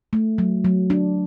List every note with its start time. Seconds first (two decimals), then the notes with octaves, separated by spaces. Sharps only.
0.13 A3
0.38 F#3
0.65 F#3
0.90 D4